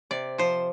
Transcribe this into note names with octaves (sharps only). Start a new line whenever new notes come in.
C3 D5
F3 C5